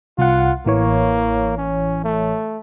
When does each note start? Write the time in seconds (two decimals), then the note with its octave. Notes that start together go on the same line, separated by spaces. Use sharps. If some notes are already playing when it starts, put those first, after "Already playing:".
0.18 C2 F4 F#5
0.66 A1 E3 A#3 C#5
1.58 C#4
2.04 A3